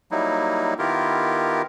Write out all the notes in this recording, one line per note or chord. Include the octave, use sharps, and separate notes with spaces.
F#3 G3 A#3 D#4 E4
D#3 B3 E4 F4 G4 A#4